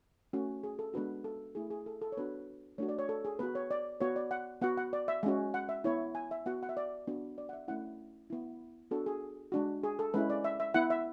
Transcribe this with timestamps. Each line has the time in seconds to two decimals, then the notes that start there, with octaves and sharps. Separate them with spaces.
0.33 A3 C#4 F#4
0.64 G#4
0.79 A4
0.94 G#3 B3 D4 F#4 B4
1.24 A4
1.55 A3 E4 G#4
1.70 G#4
1.86 A4
2.02 A4
2.12 C#5
2.17 B3 D4 F#4 B4
2.78 A3 D4 F#4 C#5
2.89 D5
2.98 C#5
3.09 A4
3.25 G#4
3.39 B3 F#4 B4
3.55 C#5
3.71 D5
4.01 B3 F#4 C#5
4.16 D5
4.31 F#5
4.61 B3 F#4 F#5
4.78 F#5
4.93 D5
5.08 E5
5.23 G#3 C#4 F#4
5.54 F#5
5.69 E5
5.84 B3 E4 C#5
6.15 G#5
6.31 E5
6.46 B3 F#4 F#5
6.63 F#5
6.69 E5
6.77 D5
7.07 B3 D4 F#4
7.38 D5
7.49 F#5
7.53 E5
7.68 A3 C#4 E4 F#5
8.30 B3 E4
8.91 B3 D4 F#4 A4
9.06 G#4
9.52 G#3 D4 F#4
9.83 G#4
9.99 A4
10.14 G#3 C#4 E4 B4
10.30 D5
10.44 E5
10.60 E5
10.74 B3 E4 F#5
10.90 E5